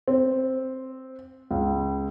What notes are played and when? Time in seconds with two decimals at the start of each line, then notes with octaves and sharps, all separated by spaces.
0.08 C4
1.51 C#2